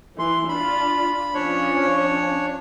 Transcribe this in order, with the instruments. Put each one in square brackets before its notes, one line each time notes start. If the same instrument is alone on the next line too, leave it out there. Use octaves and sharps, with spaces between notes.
[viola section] E3 [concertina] C6
[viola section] D4 F4 [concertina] B5
[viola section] F3 C#4 [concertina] D4 C#5